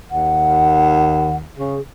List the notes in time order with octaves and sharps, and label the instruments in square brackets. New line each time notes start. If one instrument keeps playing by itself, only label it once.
[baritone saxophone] D#2 [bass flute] F#5
[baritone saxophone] C#3 [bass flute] G#4